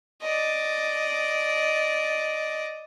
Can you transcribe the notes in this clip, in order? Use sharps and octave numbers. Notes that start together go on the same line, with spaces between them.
D5 D#5